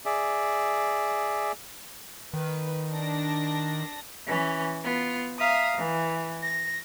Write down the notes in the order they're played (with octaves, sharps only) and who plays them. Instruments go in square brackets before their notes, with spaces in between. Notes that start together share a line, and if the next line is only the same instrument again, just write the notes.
[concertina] G#4 D5 E5
[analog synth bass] D#3 [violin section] B4
[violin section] D4 A#6
[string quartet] E3 C#4
B3 F4
E5 F5 A#5 D#6
E3
A#6